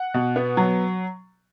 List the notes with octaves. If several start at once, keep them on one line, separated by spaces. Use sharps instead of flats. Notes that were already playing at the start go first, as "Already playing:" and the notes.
Already playing: F#5
B2
B3
F#3